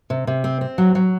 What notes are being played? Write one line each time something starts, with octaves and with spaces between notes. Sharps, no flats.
C3
C3
C4
C4
F#3
F#3